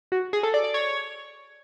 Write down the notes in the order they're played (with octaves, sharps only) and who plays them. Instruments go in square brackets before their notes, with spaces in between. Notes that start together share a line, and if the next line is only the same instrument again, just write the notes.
[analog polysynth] F#4
G#4
A4
D5
D5
C#5